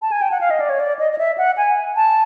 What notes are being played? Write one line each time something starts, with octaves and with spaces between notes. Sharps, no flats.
A5
G#5
G5
F#5
F5
D#5
D5
C#5
D5
D#5
D#5
E5
F#5
G#5
A5